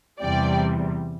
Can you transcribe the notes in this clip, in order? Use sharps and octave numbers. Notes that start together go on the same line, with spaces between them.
E2 C3 E3 G3 D5 G5